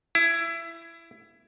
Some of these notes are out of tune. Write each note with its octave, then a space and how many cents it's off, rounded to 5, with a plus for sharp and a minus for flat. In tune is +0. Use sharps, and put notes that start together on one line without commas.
E4 +20